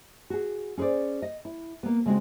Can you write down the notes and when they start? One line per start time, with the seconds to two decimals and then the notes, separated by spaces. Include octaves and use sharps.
0.30 F#4 G#4
0.77 C#4 G#4 B4 C5 D5
1.22 D#5
1.45 E4
1.83 A#3 B3
2.06 C#3 G#3 C4 F#4